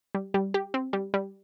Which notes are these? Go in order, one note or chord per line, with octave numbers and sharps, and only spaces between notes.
G3
G3
G4
C4
G3
G3